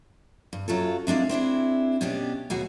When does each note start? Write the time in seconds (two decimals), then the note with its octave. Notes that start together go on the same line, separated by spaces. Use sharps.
0.53 G2
0.68 F#2 F#3 F4 A4
1.07 C3 G#3 D4 E4 F5
1.29 C4 D4 E4 G#4
2.01 B2 B3 C#4 D4 G4
2.50 D#2 B2 F#4 G#4